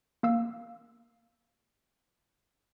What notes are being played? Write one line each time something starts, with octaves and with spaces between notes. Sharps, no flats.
A#3 F5 E6